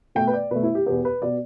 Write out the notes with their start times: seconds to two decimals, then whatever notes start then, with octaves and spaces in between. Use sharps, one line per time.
0.15 B2 A3 G5
0.27 B4
0.33 D5
0.51 B2 A3 B4
0.63 E4
0.75 G4
0.86 E2 B2 B3 G4
1.05 B4
1.22 B2 B3 D5